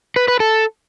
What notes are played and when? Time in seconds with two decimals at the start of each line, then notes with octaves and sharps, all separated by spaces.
0.16 B4
0.28 B4
0.40 A4